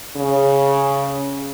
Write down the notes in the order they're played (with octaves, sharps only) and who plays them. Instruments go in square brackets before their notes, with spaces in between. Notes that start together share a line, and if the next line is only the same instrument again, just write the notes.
[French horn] C#3